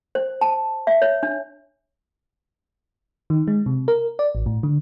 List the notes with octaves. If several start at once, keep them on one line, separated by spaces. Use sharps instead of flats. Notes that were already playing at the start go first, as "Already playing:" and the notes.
C5
A5
E5
C#5
D4
D#3
G#3
C3
A#4
D5
A1
A2
D3